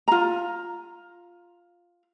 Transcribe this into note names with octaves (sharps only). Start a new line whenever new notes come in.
F4 A#5